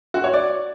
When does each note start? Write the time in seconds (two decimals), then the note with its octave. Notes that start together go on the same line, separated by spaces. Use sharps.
0.14 F#4
0.24 C#5
0.34 D5